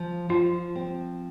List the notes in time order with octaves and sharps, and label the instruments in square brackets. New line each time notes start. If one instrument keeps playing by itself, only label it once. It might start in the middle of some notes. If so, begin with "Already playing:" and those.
Already playing: [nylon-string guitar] F3
[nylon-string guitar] F3 [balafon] F4
[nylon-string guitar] C4